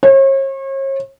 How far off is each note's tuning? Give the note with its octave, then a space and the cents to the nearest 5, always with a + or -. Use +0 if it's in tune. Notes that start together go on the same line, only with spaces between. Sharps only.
C#5 -40